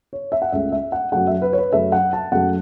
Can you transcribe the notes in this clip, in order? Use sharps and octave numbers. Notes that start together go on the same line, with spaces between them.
C#5
E5
F#5
C#2 C#3 A3 E5
E5
F#5
F#2 F#3 A3 F#5
E5
B4
C#5
B4
F#2 F#3 A3 E5
F#5
A5
F#2 F#3 A3 F#5